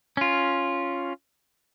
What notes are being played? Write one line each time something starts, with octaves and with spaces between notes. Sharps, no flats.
C#4 F4